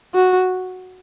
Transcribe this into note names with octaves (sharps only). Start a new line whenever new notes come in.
F#4